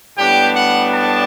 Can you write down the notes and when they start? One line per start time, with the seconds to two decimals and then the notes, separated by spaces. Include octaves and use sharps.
0.18 A2 G3 B3 D4 G4
0.54 F#5
0.91 A5